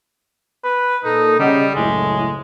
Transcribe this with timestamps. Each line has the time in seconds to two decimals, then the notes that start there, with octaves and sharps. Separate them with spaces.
0.64 B4
1.05 A#2 D#4 A4
1.39 C#3 G3 D#5 F#5
1.76 F#1 C#2 A2 G#3